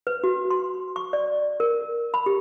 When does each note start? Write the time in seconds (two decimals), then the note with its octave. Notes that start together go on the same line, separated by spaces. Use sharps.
0.07 B4
0.24 F#4
0.50 C6
0.96 C#6
1.13 D5
1.60 A#4
2.14 B5
2.26 G4